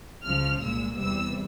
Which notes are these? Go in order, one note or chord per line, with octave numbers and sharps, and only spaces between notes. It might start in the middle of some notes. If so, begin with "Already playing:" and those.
C#2 C#3 F3 F6
C2 A#2 G#3 E6
E2 C3 E3 G3 E6